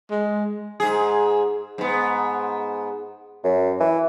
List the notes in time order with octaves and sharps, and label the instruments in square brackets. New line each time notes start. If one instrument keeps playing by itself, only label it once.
[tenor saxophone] G#3
[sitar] G#2 G#4
G#2 B3
[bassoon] F#2
E3